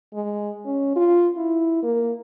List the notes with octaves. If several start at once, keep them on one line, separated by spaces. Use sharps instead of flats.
G#3
C#4
F4
E4
A#3